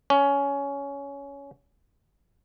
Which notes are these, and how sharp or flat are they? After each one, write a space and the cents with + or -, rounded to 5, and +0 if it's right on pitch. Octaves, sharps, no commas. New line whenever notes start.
C#4 +15